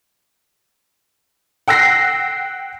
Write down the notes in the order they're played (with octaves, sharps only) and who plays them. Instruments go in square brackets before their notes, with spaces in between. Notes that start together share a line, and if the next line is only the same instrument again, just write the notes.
[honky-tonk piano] F#5 G5 E6 F#6 A#6 C7